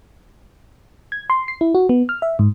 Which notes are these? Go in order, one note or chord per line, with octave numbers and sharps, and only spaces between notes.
G#6
C6
C7
E4
F#4
B3
F6
E5
G#2